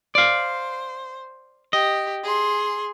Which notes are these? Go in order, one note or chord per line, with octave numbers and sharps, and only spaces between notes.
C5 D5 F5
G4 D#5
G#4 C6